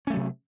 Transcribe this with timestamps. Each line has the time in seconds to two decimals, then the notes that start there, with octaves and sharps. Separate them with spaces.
0.07 C#4
0.10 A3
0.13 F#3
0.16 C3